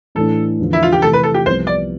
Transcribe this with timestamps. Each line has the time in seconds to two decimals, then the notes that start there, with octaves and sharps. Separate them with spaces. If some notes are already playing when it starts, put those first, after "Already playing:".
0.15 A2 E3 A3 D4 A4
0.59 E2 D3 F3
0.73 E4
0.83 F4
0.92 G4
1.02 C3 E3 A3 A4
1.13 B4
1.23 A4
1.34 G4
1.46 C2 C3 F3 B3 C5
1.67 D5